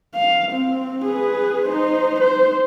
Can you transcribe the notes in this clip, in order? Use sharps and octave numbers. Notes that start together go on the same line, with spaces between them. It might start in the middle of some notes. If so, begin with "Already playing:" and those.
F5
C4
G#4 B4
D#4 C5
C5